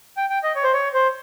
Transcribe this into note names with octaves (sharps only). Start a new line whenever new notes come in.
G5
G5
D#5
C#5
C5
C#5
C5